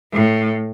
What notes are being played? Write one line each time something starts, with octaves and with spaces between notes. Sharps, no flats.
A2